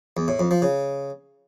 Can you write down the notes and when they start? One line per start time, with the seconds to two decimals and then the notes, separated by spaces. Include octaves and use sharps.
0.17 E2
0.28 A2
0.39 F2
0.51 F3
0.62 C#3